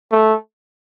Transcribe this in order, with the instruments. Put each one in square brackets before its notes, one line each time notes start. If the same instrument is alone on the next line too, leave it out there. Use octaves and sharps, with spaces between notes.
[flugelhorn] A3